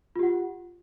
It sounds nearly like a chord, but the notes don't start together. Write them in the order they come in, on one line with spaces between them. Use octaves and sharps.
F4 G4 F#5